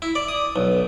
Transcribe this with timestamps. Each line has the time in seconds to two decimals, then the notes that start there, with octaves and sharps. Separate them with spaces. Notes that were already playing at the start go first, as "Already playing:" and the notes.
0.02 E4
0.15 D5
0.28 D#6
0.56 B1